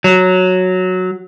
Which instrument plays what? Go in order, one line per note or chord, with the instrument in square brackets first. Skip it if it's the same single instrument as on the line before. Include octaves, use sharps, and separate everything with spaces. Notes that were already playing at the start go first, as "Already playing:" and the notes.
[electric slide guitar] F#3